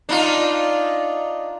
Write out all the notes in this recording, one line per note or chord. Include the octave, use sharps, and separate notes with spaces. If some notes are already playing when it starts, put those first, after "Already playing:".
D4 D#4 F4